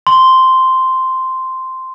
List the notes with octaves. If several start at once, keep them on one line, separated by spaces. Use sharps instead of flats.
C6